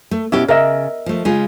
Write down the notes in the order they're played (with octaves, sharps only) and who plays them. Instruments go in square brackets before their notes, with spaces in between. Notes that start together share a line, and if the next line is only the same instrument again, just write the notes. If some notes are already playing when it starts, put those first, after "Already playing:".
[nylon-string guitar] A3
[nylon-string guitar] B2 B3 G4 [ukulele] C#4 E4
[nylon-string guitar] C#3 [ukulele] A#4 D#5 E5
[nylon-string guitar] F3 A3
C#3 G#3 F4